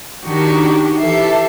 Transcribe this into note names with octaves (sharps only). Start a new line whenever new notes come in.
D#3 D4 F#4 G4
E3 G4 A4 E5 C7